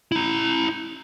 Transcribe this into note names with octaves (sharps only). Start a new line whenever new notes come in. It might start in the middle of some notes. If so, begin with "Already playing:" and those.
E4 A#5